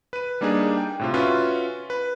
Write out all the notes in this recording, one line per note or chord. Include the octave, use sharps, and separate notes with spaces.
B4 D#7
G3 A#3 D4 D#4 G#4
G5
A2 C3 F4
C#4 F4 F#4 B4 E5
B4